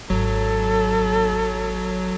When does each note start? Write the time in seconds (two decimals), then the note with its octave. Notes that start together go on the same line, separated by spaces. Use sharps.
0.10 G#1 F#3 A4